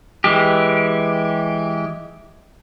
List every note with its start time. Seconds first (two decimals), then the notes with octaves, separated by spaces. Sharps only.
0.24 E3 G#3 G4